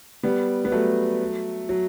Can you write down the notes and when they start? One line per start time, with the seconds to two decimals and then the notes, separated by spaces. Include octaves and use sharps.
0.23 G3 B3
0.65 B3
0.72 F#3 A3
1.69 F#3